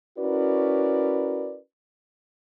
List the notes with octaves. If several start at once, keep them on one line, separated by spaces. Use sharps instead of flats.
C#4 E4 F#4 A#4 B4 D5